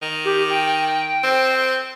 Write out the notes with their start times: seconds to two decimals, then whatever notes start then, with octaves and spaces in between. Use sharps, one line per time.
0.02 D#3
0.25 G4
0.50 G5
1.23 C4